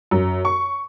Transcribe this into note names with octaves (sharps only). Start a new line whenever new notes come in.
F#2
C#6